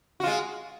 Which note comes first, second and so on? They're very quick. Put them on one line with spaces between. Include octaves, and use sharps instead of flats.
F#4 F4 G#3